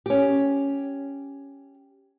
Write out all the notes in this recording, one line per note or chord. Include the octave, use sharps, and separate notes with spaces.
C#4 G4